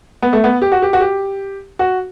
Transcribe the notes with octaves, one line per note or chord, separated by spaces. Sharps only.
B3
A3
B3
G4
F#4
G4
F#4
G4
F#4